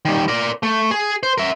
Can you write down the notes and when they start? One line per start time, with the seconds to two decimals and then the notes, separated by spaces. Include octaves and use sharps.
0.05 D#3 G3
0.28 A#4 D5
0.63 A3
0.91 G#4
1.23 C5
1.38 A#4 E5